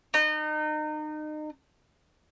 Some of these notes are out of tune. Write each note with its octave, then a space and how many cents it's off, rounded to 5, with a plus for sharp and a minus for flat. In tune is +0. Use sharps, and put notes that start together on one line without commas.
D#4 -30